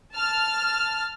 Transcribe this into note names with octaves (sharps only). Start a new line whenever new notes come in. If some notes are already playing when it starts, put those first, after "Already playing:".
A5 F6